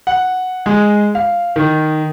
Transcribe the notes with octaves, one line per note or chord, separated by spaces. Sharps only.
F#5
G#3
F5
D#3